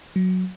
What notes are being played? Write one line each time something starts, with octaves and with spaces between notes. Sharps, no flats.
F#3